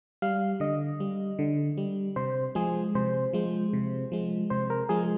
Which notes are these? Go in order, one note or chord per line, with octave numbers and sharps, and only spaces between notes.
G3 F5
D3 D#5
G3
D3
G3
C3 C5
F3 G#3 G#4
C3 C5
F3 G#3
C3
F3 G#3
C3 C5
A#4
F3 G#3 G#4